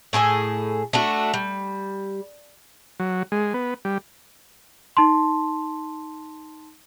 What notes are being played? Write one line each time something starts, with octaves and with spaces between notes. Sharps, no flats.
A2 G#4 A4 G#5
A3 D4 F#4
G3
F#3
G#3
B3
G3
D#4 A5 C6